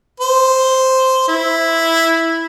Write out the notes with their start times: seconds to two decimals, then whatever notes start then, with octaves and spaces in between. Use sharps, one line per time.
0.20 C5
1.28 E4